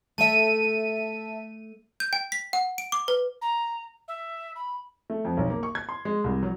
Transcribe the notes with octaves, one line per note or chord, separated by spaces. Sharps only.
A3 E5 A5 D#7
G6
G5
B6
F#5
D7
D6
B4
A#5
E5
B5
A3
F2
B1
A#3
C#6
G#6
C6
G#3
C2
F#3